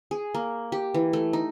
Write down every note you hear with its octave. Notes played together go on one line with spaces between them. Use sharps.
G#4
A#3
G4
E3
A3
D#4